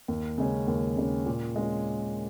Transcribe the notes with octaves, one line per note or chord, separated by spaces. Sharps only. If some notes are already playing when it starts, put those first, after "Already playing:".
D#2
C#3 G#3 C#4
D#2
C#3 G#3 C#4
A#2
G#3 C#4 F4